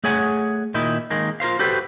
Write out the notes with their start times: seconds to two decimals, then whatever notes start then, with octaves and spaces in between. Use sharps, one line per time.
0.04 A3 G#4 C#5 F#5 G#5
0.74 A#2 D#3 D#4 E4
1.10 D#3 G#3 A#3
1.40 F4 A#4 C5 F5
1.59 F#4 G4 A4 B4 C5